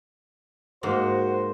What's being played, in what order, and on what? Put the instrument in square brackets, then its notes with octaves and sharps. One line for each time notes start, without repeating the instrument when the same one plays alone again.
[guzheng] G#2 A#3 D#5 [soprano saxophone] F#4 [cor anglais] C5